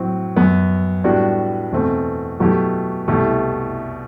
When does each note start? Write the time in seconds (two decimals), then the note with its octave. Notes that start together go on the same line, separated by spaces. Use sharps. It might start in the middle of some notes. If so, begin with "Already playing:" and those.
Already playing: A2 F#3 C4
0.36 F#2 F#3 B3
1.04 A2 G3 B3 D4 F#4
1.72 E2 B2 A3 C4
2.40 B2 F#3 A3 E4 G4
3.08 C2 B2 A3 E4 G4